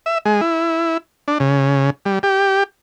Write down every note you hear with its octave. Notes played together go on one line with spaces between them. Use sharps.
E5
G#3
E4
D4
C#3
G3
G4